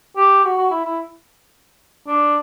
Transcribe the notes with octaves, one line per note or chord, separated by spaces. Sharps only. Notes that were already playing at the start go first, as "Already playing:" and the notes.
G4
F#4
F#4
E4
E4
D4